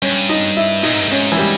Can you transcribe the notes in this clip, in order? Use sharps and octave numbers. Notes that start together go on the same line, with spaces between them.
G2 C#4
D#4
E4
A#2 D#4
G#2
G2
G#2 C#4
E3
G3